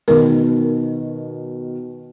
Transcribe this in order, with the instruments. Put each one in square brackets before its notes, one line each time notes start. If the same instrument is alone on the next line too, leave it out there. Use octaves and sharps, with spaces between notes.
[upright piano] B2 D#3 [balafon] A#4